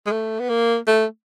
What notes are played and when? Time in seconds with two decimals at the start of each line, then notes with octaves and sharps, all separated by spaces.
0.07 G#3
0.12 A3
0.40 B3
0.49 A#3
0.87 A3